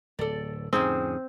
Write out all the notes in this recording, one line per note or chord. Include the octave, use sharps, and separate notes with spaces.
D1 A4 D5
F2 A2 D3 C4 C#4 D#4 G#4